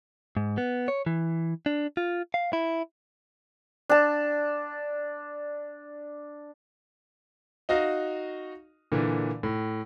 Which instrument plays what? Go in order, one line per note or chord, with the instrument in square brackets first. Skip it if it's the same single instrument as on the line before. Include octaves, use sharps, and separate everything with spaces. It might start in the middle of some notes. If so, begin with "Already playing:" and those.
[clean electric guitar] G#2
B3
C#5
E3
D4
F4
F5
E4
[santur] D4 A5
[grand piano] D#4 F#4 D#5 F5
A#2 D3 E3
A2